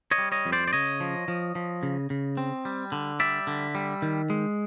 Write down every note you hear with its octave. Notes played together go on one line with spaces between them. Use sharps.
C#5 D#5
G3
C#5 D#5
F2
C5 D5
D5
C#3 C#5 D#5
F3
F3
F3
C#3
C#3
C4
G3
D3
G3 D5 E5
D3
G3
D#3
G#3